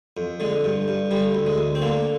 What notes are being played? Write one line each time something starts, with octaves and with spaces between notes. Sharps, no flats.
F2
D3 G#3
G2
G2
D3 G3
D2
G#3
D2
C4
D3 A#3